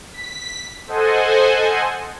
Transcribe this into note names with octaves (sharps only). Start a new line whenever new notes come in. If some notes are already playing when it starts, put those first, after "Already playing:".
B6
A4 C5 D#5 F#5 G#5